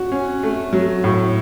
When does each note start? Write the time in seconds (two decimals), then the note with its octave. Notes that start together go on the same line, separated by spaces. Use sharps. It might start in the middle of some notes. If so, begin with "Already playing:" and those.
Already playing: F#4
0.12 C#4
0.43 A3
0.73 F#3
1.04 A2